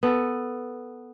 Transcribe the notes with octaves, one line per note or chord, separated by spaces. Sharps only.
B3 A4